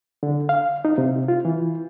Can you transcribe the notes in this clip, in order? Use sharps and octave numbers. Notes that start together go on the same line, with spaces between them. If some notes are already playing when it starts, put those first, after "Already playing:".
D3
F5
D#4
C3
F4
E3